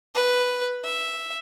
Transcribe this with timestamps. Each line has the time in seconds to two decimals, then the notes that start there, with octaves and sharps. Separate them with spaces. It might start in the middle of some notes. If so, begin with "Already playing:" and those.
0.15 B4
0.84 E5